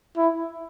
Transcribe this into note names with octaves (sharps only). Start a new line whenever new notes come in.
E4